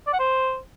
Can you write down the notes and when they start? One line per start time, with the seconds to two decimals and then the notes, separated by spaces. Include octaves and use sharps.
0.07 D5
0.13 F#5
0.19 C5